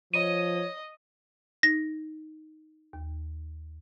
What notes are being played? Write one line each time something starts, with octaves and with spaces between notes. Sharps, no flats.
F3 C#5 D#5 D#7
D#4 A#6
D#2